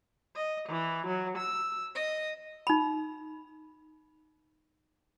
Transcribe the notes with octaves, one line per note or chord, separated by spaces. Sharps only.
D#5
E3
F#3
E6
D#5
D#4 B5